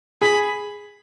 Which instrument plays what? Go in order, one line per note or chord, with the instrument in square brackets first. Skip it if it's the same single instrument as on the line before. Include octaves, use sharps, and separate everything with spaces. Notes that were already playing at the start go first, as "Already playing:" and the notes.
[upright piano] G#4 [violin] B5